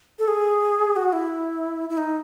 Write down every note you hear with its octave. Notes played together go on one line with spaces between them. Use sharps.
A4
G#4
F#4
E4
E4
D#4